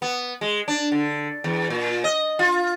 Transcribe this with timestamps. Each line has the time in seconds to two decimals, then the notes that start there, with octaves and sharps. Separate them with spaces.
0.02 B3
0.41 G#3
0.68 D4
0.92 D3
1.44 E2
1.70 A#2
2.04 D#5
2.39 F4